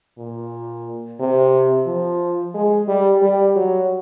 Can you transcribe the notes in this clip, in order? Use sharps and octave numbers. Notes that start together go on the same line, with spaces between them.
A#2
C3
F3
G#3
G3
G3
F#3